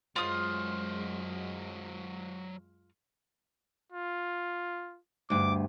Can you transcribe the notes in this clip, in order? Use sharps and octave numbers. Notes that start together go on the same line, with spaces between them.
F#2 F#3 G#3 F4 C5 D#6
F4
D2 G2 D6